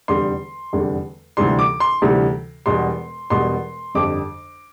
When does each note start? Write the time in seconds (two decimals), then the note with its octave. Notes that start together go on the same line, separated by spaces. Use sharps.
0.08 F1 E2 D3 G3 C6
0.73 F1 E2 D3 G3
1.37 D2 C3 E3 G3 C6
1.59 D6
1.80 C6
2.02 D2 C3 E3 G3
2.66 E1 E2 B2 G3 C6
3.30 E1 E2 B2 G3 C6
3.95 G1 F2 D3 G3 D6